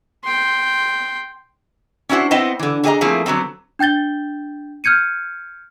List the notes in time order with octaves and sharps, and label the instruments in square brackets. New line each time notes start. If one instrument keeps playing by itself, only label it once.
[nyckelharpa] G5 C6
[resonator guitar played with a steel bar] C#4 D4 E4 F#4 C5
B3 C4 E4 C5 D#5 G5
D3 E3
D3 F#4 G#4 C#5 D#5 A#5
F3 A3 A#3 C4 E4 G#4
D3 F#3 B3 C4
[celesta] D4 G5 G6 A6 G7
F6 G6 G#6 C#7 D#7